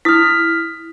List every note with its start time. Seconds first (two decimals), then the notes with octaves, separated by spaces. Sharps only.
0.05 E4 D#6 F6 B6